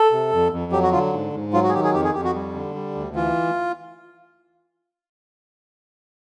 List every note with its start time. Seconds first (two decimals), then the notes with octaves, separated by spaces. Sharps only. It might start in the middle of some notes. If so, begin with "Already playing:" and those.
Already playing: A4
0.12 C3
0.32 F2
0.52 F2
0.72 F#3 G4
0.83 F#4
0.92 D3 F4
1.13 G#2
1.33 G#2
1.53 F#3 F4
1.63 F#4
1.69 G#4
1.74 D#3 G4
1.84 G#4
1.94 F2 G4
2.04 G#4
2.14 F2 G4
2.24 F#4
2.34 G3
2.54 D3
2.75 G3
2.95 D2
3.15 E3 F4